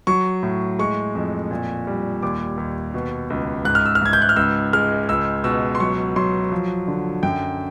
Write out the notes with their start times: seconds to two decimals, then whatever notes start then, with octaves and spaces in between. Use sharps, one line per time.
0.07 F#3 C#6
0.43 A2
0.79 G#3 C#6
1.15 F2
1.51 A#2
1.87 G3
2.23 D#2 D6
2.57 D#2
2.94 B2
3.30 C#2
3.65 G#2 F#6
3.75 F6
3.86 E6
3.95 F6
4.02 G#2 G#6
4.13 G6
4.22 F#6
4.29 F6
4.36 C#2 E6
4.73 G#3 F6
5.09 C#2 E6
5.44 B2 E6
5.75 C6
5.80 F#3 C#6
6.16 F#3 C6
6.52 F3
6.88 D3
7.23 F#2 G5